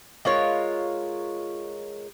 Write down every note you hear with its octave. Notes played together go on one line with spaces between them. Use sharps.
G#3 F4 A#4 C#5